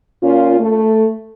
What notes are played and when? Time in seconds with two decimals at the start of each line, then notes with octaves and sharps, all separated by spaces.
0.23 A#2 C#4 F4
0.59 A3